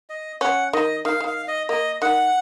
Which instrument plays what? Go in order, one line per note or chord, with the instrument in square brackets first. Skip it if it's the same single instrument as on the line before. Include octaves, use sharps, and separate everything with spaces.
[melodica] D#5
[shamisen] C#4 [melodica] F#5
[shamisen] D#3 [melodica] D#5
[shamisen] D#3 [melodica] F5
[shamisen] D#3
[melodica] F5
D#5
[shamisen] A#3 [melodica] D#5
[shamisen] D#3 [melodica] F#5